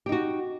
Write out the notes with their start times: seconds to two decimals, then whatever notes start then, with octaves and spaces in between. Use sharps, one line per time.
0.06 G4
0.09 D#4
0.12 F#4